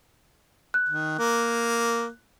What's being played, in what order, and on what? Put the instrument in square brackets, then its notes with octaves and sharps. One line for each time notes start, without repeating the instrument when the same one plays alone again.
[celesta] F#6
[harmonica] D#3
A#3